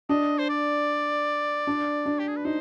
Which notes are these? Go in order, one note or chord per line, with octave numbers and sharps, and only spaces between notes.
D4 D#5
C5
D5
D4
D4
G4
G#4
B4
D#4 C5